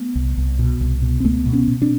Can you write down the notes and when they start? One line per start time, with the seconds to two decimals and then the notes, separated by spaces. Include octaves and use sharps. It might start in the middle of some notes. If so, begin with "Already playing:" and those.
Already playing: A3 B3
0.15 C2
0.37 C2
0.59 B2
0.81 C2
1.02 B2
1.20 C4
1.24 C#2 A3 B3
1.45 B2
1.53 B3 C#4
1.68 B2
1.82 C4 D4